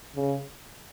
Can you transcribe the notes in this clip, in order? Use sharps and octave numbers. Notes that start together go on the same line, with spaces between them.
C#3